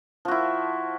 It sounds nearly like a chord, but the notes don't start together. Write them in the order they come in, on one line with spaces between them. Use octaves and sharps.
F3 F#4 E4